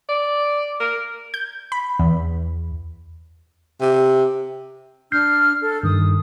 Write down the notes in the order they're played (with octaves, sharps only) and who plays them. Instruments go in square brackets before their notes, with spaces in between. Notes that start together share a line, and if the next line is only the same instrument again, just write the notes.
[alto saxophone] D5
A#4
[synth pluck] G6
B5
E2
[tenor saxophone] C3
[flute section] D4 F6 [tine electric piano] G6 C7
[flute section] A4
[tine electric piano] G2 D#3 [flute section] D#6